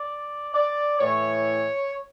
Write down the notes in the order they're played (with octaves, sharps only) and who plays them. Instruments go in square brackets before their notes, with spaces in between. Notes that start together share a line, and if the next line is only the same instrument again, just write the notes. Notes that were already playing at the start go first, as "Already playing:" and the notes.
Already playing: [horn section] D5
D5
A2 E3 C#5